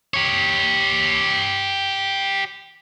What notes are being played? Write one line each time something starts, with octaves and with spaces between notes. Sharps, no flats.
G4 C#5